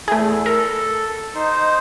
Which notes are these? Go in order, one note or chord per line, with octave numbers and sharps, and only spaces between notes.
E2 A3 E4 G#4
A4 A#4
D#4 C5